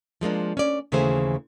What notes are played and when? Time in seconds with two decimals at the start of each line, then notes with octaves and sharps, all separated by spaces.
0.21 F3 G#3 A#3 D4
0.57 C#4 D5
0.92 D#2 C#3 E3 A3 G#4 C5